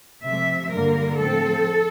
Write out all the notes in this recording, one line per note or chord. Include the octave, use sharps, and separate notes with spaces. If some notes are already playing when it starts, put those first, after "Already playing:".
C3 F3 A3 C4 E5
G2 D3 G3 A#3 A#4
A2 F3 C4 A4